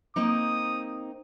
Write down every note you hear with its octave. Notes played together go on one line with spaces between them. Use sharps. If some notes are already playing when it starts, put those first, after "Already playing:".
A#3 C4 D#4 D#6